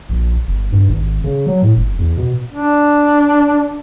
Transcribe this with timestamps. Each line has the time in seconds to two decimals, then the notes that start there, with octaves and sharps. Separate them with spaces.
0.09 A#1
0.47 G1
0.72 G2
0.88 G#1
1.24 C#3
1.46 F#3
1.62 A2
1.77 G1
1.99 E2
2.17 B2
2.53 D4